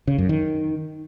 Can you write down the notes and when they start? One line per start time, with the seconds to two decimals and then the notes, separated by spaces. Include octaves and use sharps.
0.07 C#3
0.18 F#2
0.29 D#3